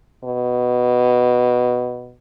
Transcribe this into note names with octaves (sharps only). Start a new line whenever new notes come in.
B2